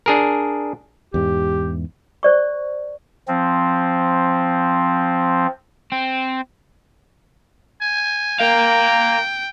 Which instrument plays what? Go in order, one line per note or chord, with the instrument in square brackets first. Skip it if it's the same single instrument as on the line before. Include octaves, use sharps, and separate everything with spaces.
[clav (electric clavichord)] D4 G#4 A#4
[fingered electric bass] E2 G#2 [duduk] G4
[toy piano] C5 D5 C#6
[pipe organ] F3 C4
[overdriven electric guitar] C4
[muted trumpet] G#5
[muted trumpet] A#3 [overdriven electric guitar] A#4 F5 [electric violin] G5